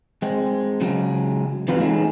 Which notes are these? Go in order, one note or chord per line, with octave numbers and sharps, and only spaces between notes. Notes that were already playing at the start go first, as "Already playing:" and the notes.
G#3 C4
C#3 F#3 G#3
E2 C4 F4 G4 B4 F5
E3 G#3 A3 C#4 D#4 G#4